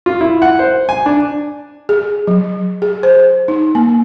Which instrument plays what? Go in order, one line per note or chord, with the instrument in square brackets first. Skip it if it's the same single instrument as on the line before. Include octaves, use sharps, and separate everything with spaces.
[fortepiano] F4
E4
F#5
C5
G#5
D4
[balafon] G#4
F#3
G#4
C5
D#4
A#3